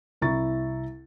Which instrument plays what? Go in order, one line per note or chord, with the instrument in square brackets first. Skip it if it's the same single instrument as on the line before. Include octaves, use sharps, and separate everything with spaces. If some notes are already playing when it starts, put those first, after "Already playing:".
[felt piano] C2 E4 A#5 C#6 A6